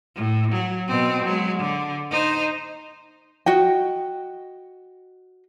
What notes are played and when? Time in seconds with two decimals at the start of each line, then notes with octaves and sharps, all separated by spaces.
0.16 A2
0.52 F#3
0.88 B2 C4
1.24 F#3 G#3
1.59 D3
2.11 D#4 C5
3.46 F#4 D#5 G5